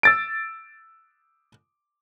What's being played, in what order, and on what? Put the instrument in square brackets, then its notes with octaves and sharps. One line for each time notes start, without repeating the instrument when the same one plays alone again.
[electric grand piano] E6 A6 D7